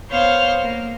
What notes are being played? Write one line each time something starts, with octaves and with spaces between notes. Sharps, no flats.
B3 C5 C#5 F5
A#3